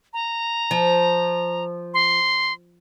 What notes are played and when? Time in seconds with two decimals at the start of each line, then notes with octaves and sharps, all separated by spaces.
0.13 A#5
0.71 F3
1.94 C6